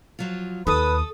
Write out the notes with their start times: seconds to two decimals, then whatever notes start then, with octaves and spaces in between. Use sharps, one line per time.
0.19 F3 F#3 F4
0.67 D#2 D#4 A4 B4 D#6